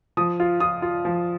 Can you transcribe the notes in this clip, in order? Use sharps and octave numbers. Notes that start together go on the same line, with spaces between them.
F3 D#6
F4
F4 D#6
F4
F3